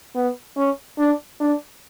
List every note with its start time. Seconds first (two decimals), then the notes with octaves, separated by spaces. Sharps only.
0.15 B3
0.56 C#4
0.98 D4
1.40 D4